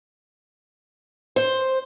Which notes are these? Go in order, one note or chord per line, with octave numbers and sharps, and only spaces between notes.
C5